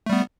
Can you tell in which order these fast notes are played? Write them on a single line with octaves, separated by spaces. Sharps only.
A3 G3 B3